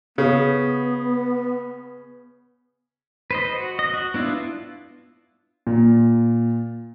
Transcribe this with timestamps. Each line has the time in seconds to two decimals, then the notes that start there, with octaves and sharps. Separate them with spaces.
0.18 C#3 B3
3.31 B4 C5 D#5
3.55 F#4
3.79 D#5
3.94 F#4
4.14 B3 D4 E4 F4
5.67 A#2